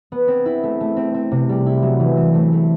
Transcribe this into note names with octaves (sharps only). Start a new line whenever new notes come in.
B3
C4
E4
A3
A3
C4
C4
C3
G3
E4
F#3
E3
C4
A3
A3